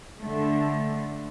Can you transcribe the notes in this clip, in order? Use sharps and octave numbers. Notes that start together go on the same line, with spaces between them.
D3 A3